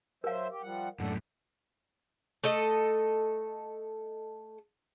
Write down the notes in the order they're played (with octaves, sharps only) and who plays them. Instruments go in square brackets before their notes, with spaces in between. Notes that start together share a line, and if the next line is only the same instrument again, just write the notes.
[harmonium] F#3 C5 E5 [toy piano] A#4 F5
[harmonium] G4
F3 G3 F#5
[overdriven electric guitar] F#2 A2 [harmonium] D4 A4 F#5
[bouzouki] A3 A4 D#5